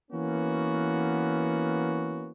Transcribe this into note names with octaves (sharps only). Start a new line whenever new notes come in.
E3 A#3 B3 C#4 F#4